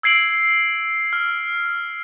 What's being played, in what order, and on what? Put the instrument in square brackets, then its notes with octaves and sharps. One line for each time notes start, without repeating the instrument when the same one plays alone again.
[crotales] E6 G#6 C7 D7 F#7
F6